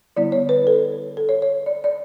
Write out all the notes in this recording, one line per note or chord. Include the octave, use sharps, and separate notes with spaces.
D3 G3 B3 E4 D5
C#5
B4
A4
A4
C#5
C#5
D5
D5